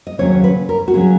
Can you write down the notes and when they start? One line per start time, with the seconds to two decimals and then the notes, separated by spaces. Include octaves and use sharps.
0.07 D#5
0.18 D#2 C#3 F#3 C#4 C#5
0.44 B4
0.69 A#4
0.88 F#4
0.94 C#3 F#3 C#4 G#4